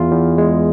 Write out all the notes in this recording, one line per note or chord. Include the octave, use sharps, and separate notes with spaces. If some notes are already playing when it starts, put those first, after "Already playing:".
Already playing: E2 F4
E2
G#3